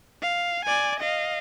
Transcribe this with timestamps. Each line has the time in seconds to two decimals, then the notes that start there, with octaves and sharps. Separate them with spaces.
0.22 F5
0.65 D5 G#5
1.00 D#5 F5